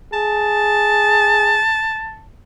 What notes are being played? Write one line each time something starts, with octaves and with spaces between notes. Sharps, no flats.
G#4 A5